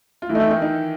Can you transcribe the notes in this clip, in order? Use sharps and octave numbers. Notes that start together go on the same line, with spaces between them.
F4
E3 A3 E4
D#4
E3 E4
D#3 D#4
D#3 D#4